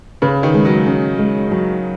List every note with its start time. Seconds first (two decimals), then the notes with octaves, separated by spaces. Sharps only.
0.22 C#3 B4
0.43 D#3
0.54 G#3
0.65 F#3
0.86 C#4
1.18 G#3
1.51 F#3